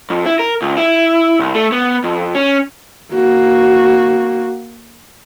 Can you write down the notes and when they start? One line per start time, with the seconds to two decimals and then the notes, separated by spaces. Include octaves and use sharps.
0.10 F2
0.26 E4
0.39 A#4
0.62 C#2
0.77 E4
1.39 C2
1.55 A3
1.72 B3
2.04 F2
2.35 C#4
3.14 A#3 F#4